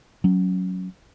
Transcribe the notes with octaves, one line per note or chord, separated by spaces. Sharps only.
F#3 C#4